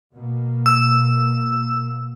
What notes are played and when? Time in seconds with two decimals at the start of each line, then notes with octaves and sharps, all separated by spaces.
0.14 B2 A#3
0.66 E6